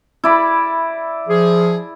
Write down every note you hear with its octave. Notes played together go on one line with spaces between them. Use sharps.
E4 D5 B5
F3 G#4